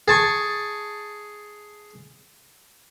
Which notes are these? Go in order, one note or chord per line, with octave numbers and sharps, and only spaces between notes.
G#4 A5 C#6